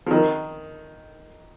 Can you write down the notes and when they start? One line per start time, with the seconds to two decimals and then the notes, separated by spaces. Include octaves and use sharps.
0.06 F3
0.11 D#3